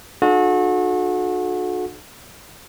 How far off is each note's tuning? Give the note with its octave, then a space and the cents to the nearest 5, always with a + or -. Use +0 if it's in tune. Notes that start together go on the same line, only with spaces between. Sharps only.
D4 +45 F#4 -30 A4 -40